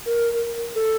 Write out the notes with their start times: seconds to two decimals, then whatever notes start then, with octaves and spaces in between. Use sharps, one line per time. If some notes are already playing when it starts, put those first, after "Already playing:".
0.06 A#4
0.75 A4